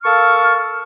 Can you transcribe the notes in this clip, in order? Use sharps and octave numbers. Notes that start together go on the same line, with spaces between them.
A#3 A4 F5 A5 C#6 F6